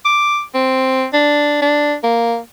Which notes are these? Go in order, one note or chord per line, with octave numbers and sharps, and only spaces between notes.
D6
C4
D4
D4
A#3